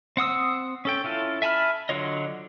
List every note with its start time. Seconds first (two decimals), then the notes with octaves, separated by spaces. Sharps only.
0.17 C4 F#5 D#6 E6
0.85 C#4 A4 G5
1.04 C#4 E4 F4 A4
1.42 E5 G#5 A5 B5 F6
1.89 D3 F#3 F4 C#5 D#5